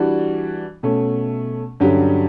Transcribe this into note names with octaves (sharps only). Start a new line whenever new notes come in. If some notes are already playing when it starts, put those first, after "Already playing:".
Already playing: E3 G3 D4 F#4
B2 A3 C#4
G2 D3 F#3 C#4 G4